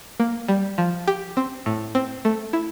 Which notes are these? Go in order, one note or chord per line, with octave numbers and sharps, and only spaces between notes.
A#3
G3
F3
G4
C4
A2
C4
A3
E4